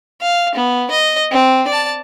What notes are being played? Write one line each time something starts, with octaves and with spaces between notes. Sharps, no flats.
F5
B3
D#5
C4
D5 A5